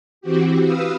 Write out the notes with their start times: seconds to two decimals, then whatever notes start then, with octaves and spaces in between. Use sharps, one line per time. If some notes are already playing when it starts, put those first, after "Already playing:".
0.21 E3 C4 F#4 G4
0.62 B4 F5 D#6 E6